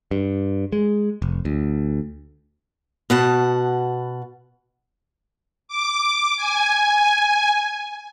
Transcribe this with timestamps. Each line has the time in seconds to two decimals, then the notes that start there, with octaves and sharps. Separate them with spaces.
0.11 G2
0.72 G#3
1.22 F1
1.45 D2
3.10 B2 F#5 A5
5.68 D6
6.37 G#5